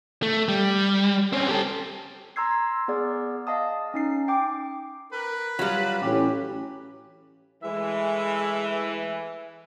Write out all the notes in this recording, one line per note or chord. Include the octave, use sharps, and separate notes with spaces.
A3
G3
C4 C#4
G4 A4
A#5 C6 E6 G#6 C7
B3 G#4 D5
D#5 F5 A5 D#6
C#4 D#4 C7
G5 D6
A#4 B4
F#3 G3 F4
A1 C#4 G4
E3 G#3 A3 E5